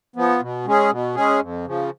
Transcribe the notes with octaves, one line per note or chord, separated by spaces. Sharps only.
F3 B3
B2
G#3 C#4 G#4
B2
G#3 C#4 G#4
F2
C#3 F3